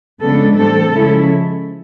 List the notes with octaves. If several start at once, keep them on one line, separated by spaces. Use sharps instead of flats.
C#3 F3 G#3 B3 D4 A4
A2 E3 G3 C4 A4
C#3 F3 G#3 C#4 E4